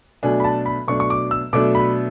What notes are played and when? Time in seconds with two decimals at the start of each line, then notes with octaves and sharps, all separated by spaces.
0.23 B2 F#3 A3 D4 G#5
0.40 B5
0.44 A5
0.66 B5
0.88 B2 F#3 A3 D4 C#6
1.00 C#6
1.10 D6
1.31 E6
1.53 B2 F#3 A3 D4 D6
1.75 B5